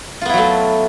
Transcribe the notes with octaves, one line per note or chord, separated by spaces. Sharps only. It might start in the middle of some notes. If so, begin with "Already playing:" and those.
F#3 A3 B3 E4 F4